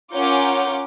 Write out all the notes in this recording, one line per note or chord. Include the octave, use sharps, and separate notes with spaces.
C#4 F4 A#4 F#5 D6 G6